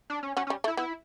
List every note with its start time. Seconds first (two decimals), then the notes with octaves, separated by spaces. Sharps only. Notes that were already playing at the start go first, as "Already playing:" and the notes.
0.10 D4
0.23 C#4
0.37 F#3 C#4 F#4
0.47 C#4
0.50 G3
0.64 A3
0.67 E4
0.77 B3 E4